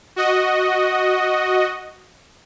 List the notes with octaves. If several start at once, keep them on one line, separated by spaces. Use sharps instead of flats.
F#4 D#5